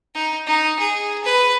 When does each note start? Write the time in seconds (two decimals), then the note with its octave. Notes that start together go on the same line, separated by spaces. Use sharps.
0.15 D#4
0.47 D#4
0.79 G#4
1.24 B4